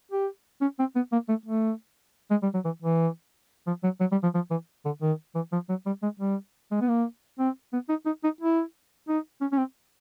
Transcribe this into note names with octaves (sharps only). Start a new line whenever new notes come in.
G4
C#4
C4
B3
A#3
A3
A3
G#3
G3
F#3
E3
E3
F3
F#3
F#3
G3
F3
F3
E3
D3
D#3
E3
F3
F#3
G3
G#3
G3
G#3
B3
A#3
C4
B3
D#4
D#4
D#4
E4
D#4
C#4
C#4
C4